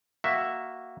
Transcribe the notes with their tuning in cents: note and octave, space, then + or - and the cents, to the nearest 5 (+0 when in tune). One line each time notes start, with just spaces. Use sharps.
A#3 +5 F#4 +0 E5 +0